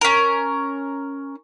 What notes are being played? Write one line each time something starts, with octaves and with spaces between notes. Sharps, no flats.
C#4 A#4